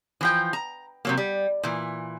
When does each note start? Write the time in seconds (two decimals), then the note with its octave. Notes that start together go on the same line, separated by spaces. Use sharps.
0.21 E3 F3 G5
0.53 A#5
1.05 C3 F#3 A#3
1.17 G3
1.63 A#2 E3